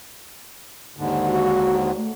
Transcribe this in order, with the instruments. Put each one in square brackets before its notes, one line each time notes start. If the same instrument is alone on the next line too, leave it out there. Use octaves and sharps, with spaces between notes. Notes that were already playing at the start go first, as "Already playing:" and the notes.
[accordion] D#2 G#2 D3
[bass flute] F#4
A3